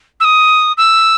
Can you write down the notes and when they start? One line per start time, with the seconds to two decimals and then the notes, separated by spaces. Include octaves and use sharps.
0.20 E6
0.24 D#6
0.77 E6